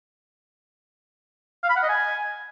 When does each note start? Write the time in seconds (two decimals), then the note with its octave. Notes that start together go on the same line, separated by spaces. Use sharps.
1.63 F5
1.69 B5
1.76 F#5
1.83 D#5
1.89 G#5